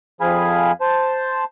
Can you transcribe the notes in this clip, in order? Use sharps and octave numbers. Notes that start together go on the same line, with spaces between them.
F2 F3 G#4 F5 G#5 B5
C5 A5